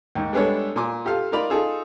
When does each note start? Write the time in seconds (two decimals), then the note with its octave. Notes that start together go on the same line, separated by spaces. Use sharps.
0.15 D#2 G#2
0.33 G3 G#3 B3 D4 A4 C#5
0.76 A#2 G#5 C6 D6
1.05 F4 G4 A4 F5
1.32 D#4 F4 A#4 D5 B5
1.50 D#4 F4 G#4 A4